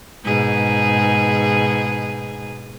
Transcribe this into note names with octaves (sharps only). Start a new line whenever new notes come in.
G#2 B2 G#4